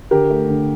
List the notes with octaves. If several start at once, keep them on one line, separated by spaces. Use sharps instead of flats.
D3 G4 A#4
A3
D3